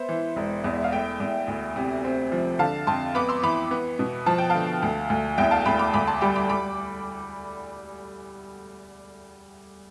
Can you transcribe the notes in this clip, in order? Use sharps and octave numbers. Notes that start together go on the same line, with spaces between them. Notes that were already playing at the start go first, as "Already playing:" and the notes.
Already playing: B3 C5 E5
E3
E1
E2
E5
F5
A3 E5 G5
E2
D2
C3
C4
F3
D3 F5 A5
F2 A5 C6
B3 B5 D6
C6 E6
E3 B5 D6
B3
B2
F3 A5
G5
D3 F5 A5
D2
D2
E2 E5 G5
F5 A5
E2 G5 B5
B5 D6
D2 B5 D6
A5 C6
G3 G5 B5
B5 D6
G3 B5 D6